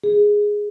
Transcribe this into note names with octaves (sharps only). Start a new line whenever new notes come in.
G#4